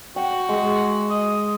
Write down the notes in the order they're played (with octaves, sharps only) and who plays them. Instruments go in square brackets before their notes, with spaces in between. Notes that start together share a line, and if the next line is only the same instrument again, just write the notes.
[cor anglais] F#4 [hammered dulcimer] G5
[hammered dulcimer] G#3
[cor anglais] D#5